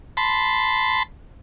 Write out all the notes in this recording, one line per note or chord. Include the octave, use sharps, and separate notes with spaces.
A5 B5 C6